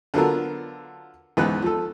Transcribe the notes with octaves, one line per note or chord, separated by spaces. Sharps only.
D3 F#3 B3 F4 A4 A#4
C#2 G#2 E3 B3 B4 F#6
F3 A4